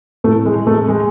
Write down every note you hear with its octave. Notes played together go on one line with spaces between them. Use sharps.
A2 A3
G#3
G#3
A3
G#3